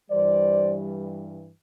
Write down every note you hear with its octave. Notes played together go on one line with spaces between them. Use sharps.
G2 E3 G3 C5 D5